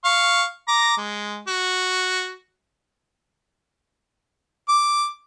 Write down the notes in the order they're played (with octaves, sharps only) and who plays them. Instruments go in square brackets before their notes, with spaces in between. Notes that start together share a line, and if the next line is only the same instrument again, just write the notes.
[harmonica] F5 C#6
A#5 D6
G#3
F#4
D6